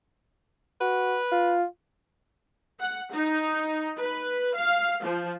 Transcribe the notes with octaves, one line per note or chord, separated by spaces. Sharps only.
F#4 B4
F4
F#5
D#4
B4
F5
F3